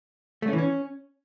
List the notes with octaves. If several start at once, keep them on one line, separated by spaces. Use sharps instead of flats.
A3
C#4
E3
C#4